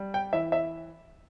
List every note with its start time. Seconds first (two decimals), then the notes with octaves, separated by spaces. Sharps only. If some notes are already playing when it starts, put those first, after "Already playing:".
Already playing: G3
0.14 G5
0.33 E3 E5
0.52 E5